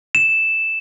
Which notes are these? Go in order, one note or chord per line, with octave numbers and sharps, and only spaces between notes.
E7